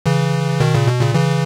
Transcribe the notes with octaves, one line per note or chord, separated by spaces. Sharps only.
C#3 E3
B2 D#3
A#2 C#3
B2
A#2 C#3
C#3 E3